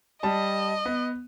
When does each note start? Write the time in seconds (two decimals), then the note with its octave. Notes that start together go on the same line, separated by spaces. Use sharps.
0.23 G3 D#5 A5
0.86 B3